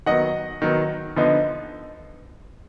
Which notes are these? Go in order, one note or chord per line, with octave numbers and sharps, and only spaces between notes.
D#3 F#3 B3 D#5 F#5
D#3 F#3 B3
D3 F3 B3 D#4